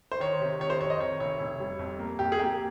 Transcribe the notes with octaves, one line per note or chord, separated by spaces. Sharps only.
C5
D#3 C#5
C3
D#3 C#5
C5
F2 C#5
D#5
D#3 C#5
F1 C#5
F1
G3
F2
A#3
F2 G4
G#4
A#3 G4